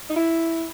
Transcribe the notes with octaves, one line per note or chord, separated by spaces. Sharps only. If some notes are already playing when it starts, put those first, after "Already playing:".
D#4
E4